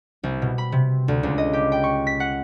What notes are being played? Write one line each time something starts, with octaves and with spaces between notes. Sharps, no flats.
C2
B2
B5
C3
D2
C#2
D#5
G4
G5
C#6
B6
F#5